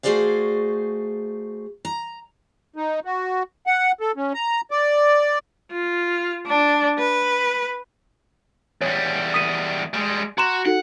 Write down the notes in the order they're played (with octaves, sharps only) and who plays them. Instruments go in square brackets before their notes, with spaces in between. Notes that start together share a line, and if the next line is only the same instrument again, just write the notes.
[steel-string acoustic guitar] A3 F#4 G#4 C5 D5 F5
A#5
[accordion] D#4
F#4
F#5
A4
C#4
A#5
D5
[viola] F4
D4
B4
[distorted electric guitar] E2 G3 [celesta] C#5
[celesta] D#6 B6 D#7
[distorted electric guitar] G3 G#3
[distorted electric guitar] F#4 [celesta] A#5 C6 E7
[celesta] D#4 F#4 A4 [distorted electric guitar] F#5